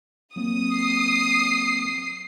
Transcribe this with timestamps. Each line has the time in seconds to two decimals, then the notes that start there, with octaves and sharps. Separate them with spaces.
0.36 F#3 A#3 C4 D#6
0.76 C7